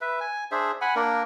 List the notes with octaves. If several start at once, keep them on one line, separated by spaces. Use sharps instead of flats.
B4 E5
G#5
D4 G#4 C5 E5
F#5 G#5 B5
A#3 D4 A#4